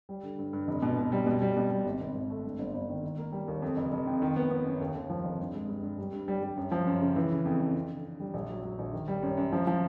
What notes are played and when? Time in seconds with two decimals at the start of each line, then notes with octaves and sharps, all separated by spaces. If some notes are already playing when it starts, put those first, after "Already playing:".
0.09 G3
0.23 D3
0.39 G2
0.53 G2
0.68 F1
0.82 B2
0.97 B2
1.12 G3
1.26 B2
1.42 G3
1.57 B2
1.71 G3
1.86 G#1
2.00 G#1
2.15 G#1
2.30 A3
2.45 G2
2.59 G1
2.74 G1
2.89 D#3
3.03 D#3
3.18 A#3
3.32 G3
3.48 D#2
3.62 F2
3.77 F1
3.92 F1
4.07 F2
4.22 D#3
4.36 B3
4.51 B3
4.66 F#2
4.81 D#2
4.95 D#2
5.10 F3
5.25 F1
5.39 G2
5.54 G#3
5.69 G2
5.83 G2
5.99 G3
6.12 G2
6.28 G3
6.43 G3
6.57 F#2
6.72 F3
6.87 F#2
7.02 C#3
7.16 E3
7.31 C#3
7.45 F2
7.61 F2
7.75 F2
7.90 D3
8.05 D3
8.20 G3
8.34 A#1
8.49 F#3
8.63 F#3
8.79 A#1
8.93 D#3
9.08 G3
9.23 F#2
9.37 F#2
9.52 F3
9.67 F3